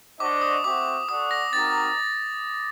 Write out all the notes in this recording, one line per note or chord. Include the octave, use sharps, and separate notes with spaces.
D4 F#4 C5 D#5 D6
D#6
A3 C4 F#4 D6
F#4 A4 D5 F#5 D#6
A#6
C4 D#4 F#4 A#4 A6